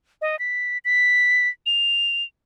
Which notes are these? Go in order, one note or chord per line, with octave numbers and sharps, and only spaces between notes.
D#5
B6
B6
F7